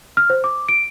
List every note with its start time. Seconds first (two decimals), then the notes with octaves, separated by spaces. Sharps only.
0.17 F6
0.30 C5
0.44 D6
0.69 D7